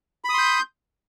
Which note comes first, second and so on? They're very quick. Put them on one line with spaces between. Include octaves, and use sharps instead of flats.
B5 D#6 C6 G6